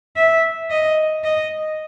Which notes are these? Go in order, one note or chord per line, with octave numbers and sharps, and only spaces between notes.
E5
D#5
D#5